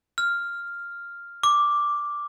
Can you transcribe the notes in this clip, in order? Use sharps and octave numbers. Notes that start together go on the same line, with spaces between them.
F6
D6